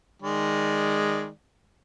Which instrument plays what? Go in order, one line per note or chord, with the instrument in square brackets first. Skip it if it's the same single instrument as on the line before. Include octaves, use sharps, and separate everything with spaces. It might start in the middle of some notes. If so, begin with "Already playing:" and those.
[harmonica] D#3 G#3 D5